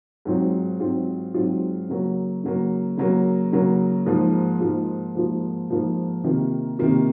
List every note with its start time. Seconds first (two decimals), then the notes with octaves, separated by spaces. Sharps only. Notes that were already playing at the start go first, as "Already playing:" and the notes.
0.25 G#2 F#3 C4 F4
0.80 G#2 F#3 C4 F4
1.34 G#2 F#3 C4 F4
1.89 C#3 F#3 A#3
2.44 C#3 F#3 A#3
2.97 C#3 F#3 A#3
3.52 C#3 F#3 A#3
4.06 G#2 F3 A#3 F4
4.60 G#2 F3 A#3 F4
5.15 G#2 F3 A#3 F4
5.70 G#2 F3 A#3 F4
6.24 C3 D#3 A#3 F4
6.79 C3 D#3 A#3 F4